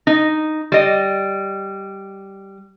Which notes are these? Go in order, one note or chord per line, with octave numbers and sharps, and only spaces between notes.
D#4
G3 D#5